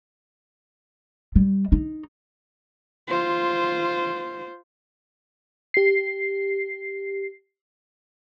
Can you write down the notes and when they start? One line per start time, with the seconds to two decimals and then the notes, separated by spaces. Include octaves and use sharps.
1.36 G3
1.72 D#4
3.08 F4 C5
5.74 G4 C7